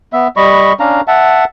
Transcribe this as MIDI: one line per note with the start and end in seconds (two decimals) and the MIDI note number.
0.13 0.28 59
0.13 0.28 76
0.37 0.73 55
0.37 0.73 75
0.37 0.73 83
0.37 0.73 85
0.80 1.01 61
0.80 1.01 62
0.80 1.01 77
0.80 1.01 82
1.08 1.45 76
1.08 1.45 78
1.08 1.45 81